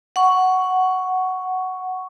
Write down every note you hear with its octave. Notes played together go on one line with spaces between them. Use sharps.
F#5 C#6